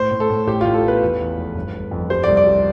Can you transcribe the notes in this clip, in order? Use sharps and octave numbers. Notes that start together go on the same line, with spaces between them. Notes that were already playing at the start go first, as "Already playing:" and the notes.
Already playing: A2 C5
A2
A4
A2
A1 G4
A1 F4
A4
B3
B4
E2
E2
F1
G1
G1
F2
G3 C5
D5
C2
D5
G3